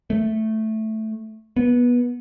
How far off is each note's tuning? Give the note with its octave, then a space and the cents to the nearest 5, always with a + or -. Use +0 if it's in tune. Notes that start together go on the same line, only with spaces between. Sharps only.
A3 -5
B3 -20